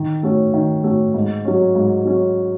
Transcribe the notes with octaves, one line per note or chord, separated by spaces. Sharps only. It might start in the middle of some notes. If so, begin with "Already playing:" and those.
Already playing: D#3
A3 C#4 F#4
D#3
A3 C#4 F#4
G#2
F#3 C#4
G#2
F#3 C#4